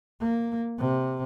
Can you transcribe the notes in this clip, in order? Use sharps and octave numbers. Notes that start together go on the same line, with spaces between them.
A#3
C3